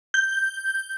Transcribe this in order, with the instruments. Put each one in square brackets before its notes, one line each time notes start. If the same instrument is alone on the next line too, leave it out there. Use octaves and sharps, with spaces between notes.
[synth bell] G6